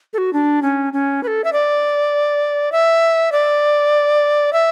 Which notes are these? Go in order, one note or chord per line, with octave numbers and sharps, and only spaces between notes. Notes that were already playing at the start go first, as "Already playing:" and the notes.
A4
F#4
D4
C#4
C#4
B4
A4
E5
D5
E5
D5
E5